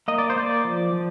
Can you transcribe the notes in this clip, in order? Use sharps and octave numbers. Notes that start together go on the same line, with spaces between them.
A#3 D#5
D5
C5
A#3 D5
F3
F3